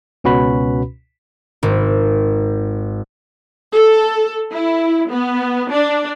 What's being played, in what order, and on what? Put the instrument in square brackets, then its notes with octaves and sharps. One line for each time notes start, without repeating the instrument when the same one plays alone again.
[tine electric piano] C#2 B2 C#4 F#4 B4 B5
[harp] G#1
[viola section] A4
E4
B3
D4